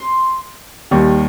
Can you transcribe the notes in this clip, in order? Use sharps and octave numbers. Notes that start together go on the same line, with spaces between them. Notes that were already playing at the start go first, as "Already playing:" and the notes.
Already playing: C6
D#2 D#3 G3